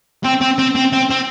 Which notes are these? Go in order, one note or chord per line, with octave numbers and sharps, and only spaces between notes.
C4
C4
C4
C4
C4
C4